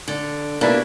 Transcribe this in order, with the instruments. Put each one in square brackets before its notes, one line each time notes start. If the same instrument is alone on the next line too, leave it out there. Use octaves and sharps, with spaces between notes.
[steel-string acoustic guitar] D3
[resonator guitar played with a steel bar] B2 E4 G4 [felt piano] A#3 B4 [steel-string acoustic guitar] D4